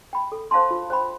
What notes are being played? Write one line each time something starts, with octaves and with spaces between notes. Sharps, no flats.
G5 B5
A4
C5 F5 A5 C6
F4
C5 G5 B5